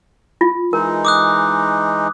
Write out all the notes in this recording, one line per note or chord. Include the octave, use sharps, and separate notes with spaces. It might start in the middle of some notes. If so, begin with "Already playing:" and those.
F4
E3 G#3 D#4 A#4
D6 D#6 F#6